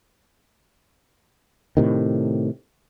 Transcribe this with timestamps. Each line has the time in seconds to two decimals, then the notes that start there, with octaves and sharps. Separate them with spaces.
1.77 A2 C3 D#3